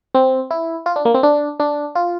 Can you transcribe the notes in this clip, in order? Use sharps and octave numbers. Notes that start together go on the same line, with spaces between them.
C4
E4
F4
D4
A#3
C4
D4
D4
F4